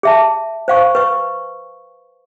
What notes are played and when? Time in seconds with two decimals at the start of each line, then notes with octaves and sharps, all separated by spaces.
0.03 G#4 E5 A5
0.68 C5 F5 C#6
0.95 B4 C#6